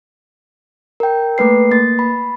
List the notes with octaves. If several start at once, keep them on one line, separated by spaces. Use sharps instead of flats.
A#4 G5
A3 A#3 B4 C7
A#3 A6
B5